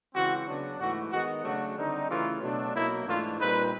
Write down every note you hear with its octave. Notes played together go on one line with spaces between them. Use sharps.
C#3 E3 G#3 C4 F#4
C#3 F#3 B3 D4
G#2 E3 A3 F#4
D#3 G#3 B3 D#4 F#4
C#3 F#3 A3 D4 F#4
D3 G3 C4 D#4
C#3 E3 A3 C#4 F4
B2 F#3 A3 D4
B2 F#3 A#3 D#4 E4
G#2 E3 A3 D4 F4
A#2 G3 C4 D#4 B4